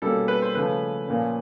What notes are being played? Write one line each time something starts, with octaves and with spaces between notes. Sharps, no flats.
B2 G3 A#3 C#4 A4
B4
C5
C#3 F3 A3 C#4 B4
A#2 F3 A#3 C#4